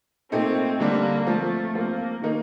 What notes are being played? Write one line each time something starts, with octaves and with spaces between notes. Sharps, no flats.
A#2 A3 C4 D#4
D3 G3 A#3 D4
F3 A3 C4 F4
F3 A#3 C4 F4
D#3 A#3 D#4